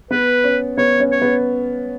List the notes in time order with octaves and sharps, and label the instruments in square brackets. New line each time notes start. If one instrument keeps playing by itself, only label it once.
[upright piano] B3 [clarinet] B4
[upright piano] C#4
[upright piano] B3 [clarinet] C#5
[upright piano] C#4
[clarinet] C#5
[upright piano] B3